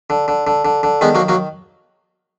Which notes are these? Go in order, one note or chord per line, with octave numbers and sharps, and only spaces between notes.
D3
D3
D3
D3
D3
D#3 G#3 B3
F#3 A#3
F#3 A#3